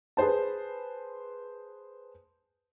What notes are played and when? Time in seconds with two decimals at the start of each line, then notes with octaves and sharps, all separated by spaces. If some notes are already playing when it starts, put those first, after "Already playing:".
0.17 G#4 B4 C5 A5